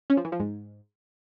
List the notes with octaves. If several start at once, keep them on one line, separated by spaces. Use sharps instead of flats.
C#4
F3
E3
F3
G#2